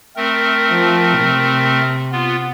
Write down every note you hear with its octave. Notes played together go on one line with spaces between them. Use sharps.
A3 C4 A#4
F3
C3
B3 F4